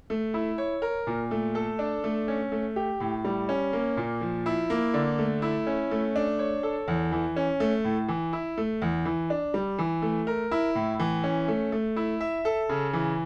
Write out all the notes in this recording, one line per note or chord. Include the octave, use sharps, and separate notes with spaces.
A3
E4
C#5
A#4
A#2
A3
A4
D4
A3
C#4
A3
G4
A2
G3
C#4
A#3
A#2
F3
E4
A#3
D3
A3
E4
C#4
A3
D4
C#5
A4
E2
E3
C#4
A3
A2
E3
E4
A3
E2
E3
D4
G3
E3
A3
A#4
E4
A2
E3
C#4
A3
A3
E4
E5
A4
C#3
E3